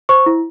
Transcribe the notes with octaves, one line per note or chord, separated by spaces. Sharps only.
C5 C#6
E4